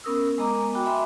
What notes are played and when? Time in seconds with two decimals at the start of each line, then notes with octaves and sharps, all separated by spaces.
0.04 B3 C#4 A#4 D#6 E6
0.38 G#3 B3 D#5 A#5 D6
0.73 F#4 G5 B5 D6
0.85 E5 G#5 B5 C6 D6